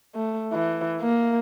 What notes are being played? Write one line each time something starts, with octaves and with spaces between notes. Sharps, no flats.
A3
E3
A#3